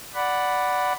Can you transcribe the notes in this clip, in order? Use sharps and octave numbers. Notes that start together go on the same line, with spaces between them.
D5 F#5 B5